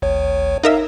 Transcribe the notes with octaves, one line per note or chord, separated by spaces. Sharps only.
G#1 D2 C#5
D#4 A#4 E5 F5